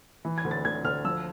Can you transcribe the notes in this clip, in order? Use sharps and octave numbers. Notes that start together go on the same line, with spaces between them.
E3
G#6
D2
A6
D2 G#6
D2 F6
F3 E6